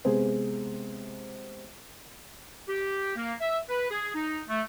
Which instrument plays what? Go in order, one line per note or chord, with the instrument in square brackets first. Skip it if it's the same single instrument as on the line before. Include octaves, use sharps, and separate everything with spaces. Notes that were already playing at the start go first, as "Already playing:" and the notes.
[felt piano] C3 G#3 B3 G#4 C5
[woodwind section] G4
A#3
E5
B4
G#4
D#4
A3